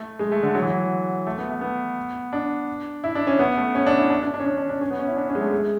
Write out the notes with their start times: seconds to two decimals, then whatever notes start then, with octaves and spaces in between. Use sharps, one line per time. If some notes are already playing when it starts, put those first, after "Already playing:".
Already playing: A3
0.19 G#3
0.32 A3
0.43 D3
0.55 F#3
0.62 E3
0.70 F#3
1.27 A3
1.38 B3
1.49 A3
1.61 B3
2.33 D4
3.04 E4
3.15 D4
3.27 C#4
3.39 B3
3.57 A3
3.75 C#4
3.86 D4
3.98 E4
4.10 D4
4.22 D4
4.34 D4
4.40 C#4
4.45 D4
4.57 D4
4.69 D4
4.81 C#4
4.90 B3
4.99 C#4
5.08 E4
5.16 D4
5.29 C#4
5.35 G#3
5.41 A3
5.51 G#3